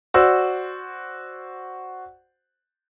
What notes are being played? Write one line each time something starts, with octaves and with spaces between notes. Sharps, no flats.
F#4 C5 D5 E6